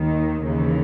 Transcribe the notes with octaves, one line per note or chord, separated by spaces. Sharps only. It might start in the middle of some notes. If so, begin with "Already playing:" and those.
Already playing: D#2 D#3
D#2 C#3 E3